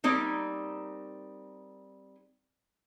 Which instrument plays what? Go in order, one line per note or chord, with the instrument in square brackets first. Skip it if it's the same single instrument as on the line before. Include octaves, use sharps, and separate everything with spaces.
[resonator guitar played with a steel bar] G3 A#3 C4 D#4